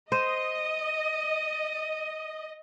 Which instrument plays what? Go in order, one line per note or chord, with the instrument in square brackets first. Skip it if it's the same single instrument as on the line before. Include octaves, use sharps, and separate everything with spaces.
[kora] C5 [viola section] D#5 [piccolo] D#7